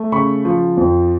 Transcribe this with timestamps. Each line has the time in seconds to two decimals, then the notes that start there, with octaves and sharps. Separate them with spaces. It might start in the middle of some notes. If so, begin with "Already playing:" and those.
Already playing: A3
0.12 C#3 B5 C#6
0.45 F3
0.77 F2